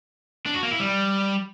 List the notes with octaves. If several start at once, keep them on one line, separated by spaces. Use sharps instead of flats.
D4
F#4
A#3
E4
G3